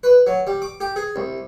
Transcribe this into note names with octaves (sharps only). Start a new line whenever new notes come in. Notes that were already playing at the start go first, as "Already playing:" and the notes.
B4
F#3
G3
D6
G4
G#4
C2